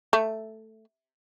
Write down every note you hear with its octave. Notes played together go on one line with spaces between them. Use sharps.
A3